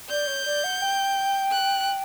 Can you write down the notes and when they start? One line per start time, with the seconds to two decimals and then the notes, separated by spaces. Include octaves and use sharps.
0.09 D5 G6
0.27 C#5
0.45 D5
0.64 F#5
0.81 G5
1.52 F#6